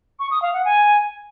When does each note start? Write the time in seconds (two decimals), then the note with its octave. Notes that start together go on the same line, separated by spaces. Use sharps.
0.19 C#6
0.31 D#6
0.42 F5
0.54 F#5
0.65 G#5